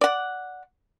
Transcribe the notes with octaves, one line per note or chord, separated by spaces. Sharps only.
D5 F#5